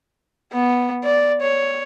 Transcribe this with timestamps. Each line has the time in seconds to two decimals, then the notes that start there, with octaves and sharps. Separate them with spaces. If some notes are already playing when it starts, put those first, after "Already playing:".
0.53 B3
1.04 D5
1.42 C#5